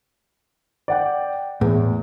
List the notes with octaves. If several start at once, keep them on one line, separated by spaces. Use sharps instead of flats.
D5 F#5 G5
E2 A2